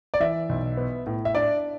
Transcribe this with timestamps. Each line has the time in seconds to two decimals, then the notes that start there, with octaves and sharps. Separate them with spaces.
0.14 D5
0.20 E3 E5
0.49 B1
0.77 B3
1.07 A2
1.25 E5
1.35 D4 D5